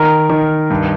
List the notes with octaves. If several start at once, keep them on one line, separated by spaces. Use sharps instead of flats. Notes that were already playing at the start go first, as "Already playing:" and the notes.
Already playing: D#3 A#4
D#3
G2